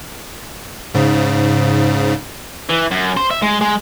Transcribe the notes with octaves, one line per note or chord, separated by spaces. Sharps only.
G#2 C#3
E3
F#2
C5
E5
G#3
G#3